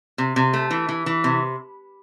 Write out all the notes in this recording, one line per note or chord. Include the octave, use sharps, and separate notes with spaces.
C3
C3
A3
E3
E3
E3
C3